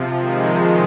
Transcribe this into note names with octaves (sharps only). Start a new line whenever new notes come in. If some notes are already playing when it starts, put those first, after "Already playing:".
Already playing: C3 F3
D#3 G#3